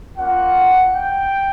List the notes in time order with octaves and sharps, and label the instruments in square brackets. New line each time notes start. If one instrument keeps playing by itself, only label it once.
[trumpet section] A#3 C#4 F4 F#5
G5